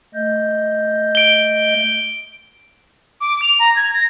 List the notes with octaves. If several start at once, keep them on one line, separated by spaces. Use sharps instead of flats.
A3 D#5 G6
D7 G7
D6
F7
A#5
G#6
A#6